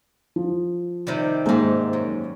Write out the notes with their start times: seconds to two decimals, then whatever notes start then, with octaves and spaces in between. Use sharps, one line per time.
0.36 F3
1.07 C3 D#3 G3
1.46 G#2 G#3 A#3 C4 G5
1.93 F#2